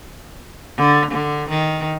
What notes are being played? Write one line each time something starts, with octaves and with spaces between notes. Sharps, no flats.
D3
D3
D#3